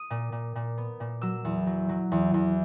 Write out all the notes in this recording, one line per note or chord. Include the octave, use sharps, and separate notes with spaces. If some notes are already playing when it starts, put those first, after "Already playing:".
Already playing: D#6
A#2
A#2
A#2
B3
A#2
F#3 E6
E2
F#3
F#3
E2
E2